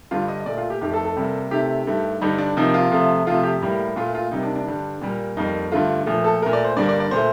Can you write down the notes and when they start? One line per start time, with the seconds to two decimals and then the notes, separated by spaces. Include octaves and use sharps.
0.11 G2 D3 G3 F4
0.28 D#5
0.40 D#5
0.46 A#2 A3 D5
0.58 F4
0.70 G4
0.81 F2 D#3 A3 G4
0.94 A4
1.05 A4
1.16 C3 G3 A#3
1.51 C3 D#3 A3 G4
1.87 G2 D#3 A3
2.21 G2 D3 G3 D#4
2.38 D4
2.57 C3 F3 A#3 D#4
2.74 F4
2.91 C3 F3 A3
3.26 C3 F3 A3 F4
3.43 G4
3.61 A2 G3 A#3
3.96 A#2 A3 F4
4.15 F4
4.31 C3 D#3 G3 A#3 D#4
4.43 D4
4.55 D4
4.66 G2 D3 G3
5.01 A#2 G3 A#3
5.37 F2 D#3 G3 A#3 D#4
5.72 G2 D3 A3 F4
6.06 A#2 F3 A3
6.24 A4
6.42 A3 A#4
6.46 A#2
6.53 D5
6.65 C5
6.77 G2 D3 G3 A#3 D5
6.89 D5
7.00 D5
7.11 A#2 A3 C5